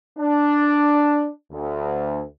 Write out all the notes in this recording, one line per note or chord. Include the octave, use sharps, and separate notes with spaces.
D4
D2